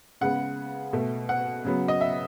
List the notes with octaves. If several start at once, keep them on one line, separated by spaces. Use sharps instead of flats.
C#3 G#3 B3 F#5
B2 A3
F#5
C#3 F#3 B3
D#5
E5